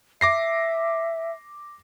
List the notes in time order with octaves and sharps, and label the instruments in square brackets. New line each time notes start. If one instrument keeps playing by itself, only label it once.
[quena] E5 [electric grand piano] D6 A#6 C7